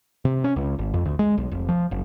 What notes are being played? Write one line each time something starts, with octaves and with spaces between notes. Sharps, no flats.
C3
C#4
C#2
G#1
F2
D2
G#3
B1
F1
F3
F#1